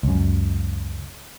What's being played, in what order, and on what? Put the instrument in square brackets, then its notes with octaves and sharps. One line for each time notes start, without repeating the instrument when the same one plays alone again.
[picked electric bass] C#2 F#2